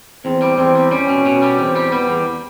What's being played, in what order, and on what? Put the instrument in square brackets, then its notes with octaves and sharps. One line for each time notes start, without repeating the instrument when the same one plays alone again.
[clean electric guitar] E2 [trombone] C4
[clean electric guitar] G3
[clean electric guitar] E2 [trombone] C4
[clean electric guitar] G3
[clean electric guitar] G3 [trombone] C#4
[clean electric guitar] B2
B2
G3
[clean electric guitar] E2 [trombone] C4
[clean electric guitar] G3
[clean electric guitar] G3 [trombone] B3
[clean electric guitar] E2